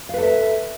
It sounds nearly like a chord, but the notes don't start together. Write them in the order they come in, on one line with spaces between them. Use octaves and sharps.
F5 B4 A4 E5